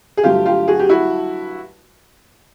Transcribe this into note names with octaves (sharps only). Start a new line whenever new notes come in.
G#4
G2 D3 F#3 A3 F4 G4
F4 G4
F#4 G#4
G4
E4 F#4